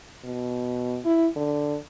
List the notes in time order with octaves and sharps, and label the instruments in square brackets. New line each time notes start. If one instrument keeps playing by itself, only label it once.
[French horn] B2
E4
D3